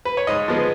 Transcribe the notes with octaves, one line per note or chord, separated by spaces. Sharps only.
B4
C#5
G#2 D#5
F3 G#3 B3